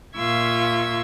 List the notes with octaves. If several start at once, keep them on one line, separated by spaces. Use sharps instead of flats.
A#2 F4 E5 C#6 E6 G#6